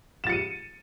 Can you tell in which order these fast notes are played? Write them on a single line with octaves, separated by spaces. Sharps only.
E7 A6 C#7 D#7